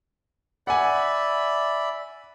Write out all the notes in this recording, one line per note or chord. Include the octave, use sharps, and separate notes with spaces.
D5 E5 F#5 G#5 B5